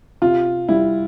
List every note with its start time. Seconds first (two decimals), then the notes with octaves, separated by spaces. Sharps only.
0.22 C3 F4
0.69 G3 E4